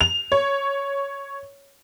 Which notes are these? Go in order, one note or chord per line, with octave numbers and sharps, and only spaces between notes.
F7
C#5